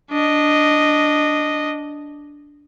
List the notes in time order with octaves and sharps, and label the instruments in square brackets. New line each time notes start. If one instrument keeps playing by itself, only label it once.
[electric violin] D4 D#5